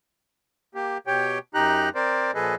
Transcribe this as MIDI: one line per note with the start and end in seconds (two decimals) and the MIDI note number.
0.75 0.98 58
0.75 0.98 67
1.07 1.38 47
1.07 1.38 67
1.07 1.38 73
1.07 1.38 79
1.54 1.89 42
1.54 1.89 63
1.54 1.89 67
1.54 1.89 82
1.54 1.89 90
1.95 2.31 60
1.95 2.31 70
1.95 2.31 72
1.95 2.31 74
2.35 2.55 46
2.35 2.55 53
2.35 2.55 68
2.35 2.55 69
2.35 2.55 71
2.35 2.55 75